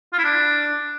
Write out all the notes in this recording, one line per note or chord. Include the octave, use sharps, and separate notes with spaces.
F4
E4
D4